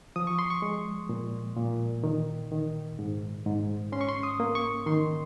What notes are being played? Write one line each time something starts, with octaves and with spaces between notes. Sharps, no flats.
F3 D#6
C#6
C6
C#6
G#3
A#2
A#2
D#3
D#3
G#2
G#2
C#4 C6
C#6
C6
D#6
A#3
C#6
D#3 C6